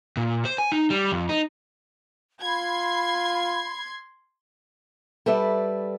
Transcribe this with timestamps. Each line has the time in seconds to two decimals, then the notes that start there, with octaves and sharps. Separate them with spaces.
0.17 A#2
0.45 C5
0.58 G#5
0.72 D#4
0.90 G3
1.12 F2
1.29 D#4
2.42 F4 B5 C6 G#6
5.26 G3 A4 B4 D5 E5